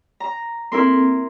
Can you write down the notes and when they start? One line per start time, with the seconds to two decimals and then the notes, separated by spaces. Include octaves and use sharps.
0.20 A#5
0.72 A#3 C4 E4 A4 A#4 C6